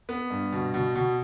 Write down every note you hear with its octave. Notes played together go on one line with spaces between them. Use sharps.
B3
G2
B2
B2
B2